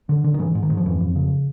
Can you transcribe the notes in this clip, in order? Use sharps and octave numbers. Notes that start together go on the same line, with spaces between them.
D3
D3
D#3
G#2 E3
G#2
D#3
G#2
F3
F2 E3
F2
C#3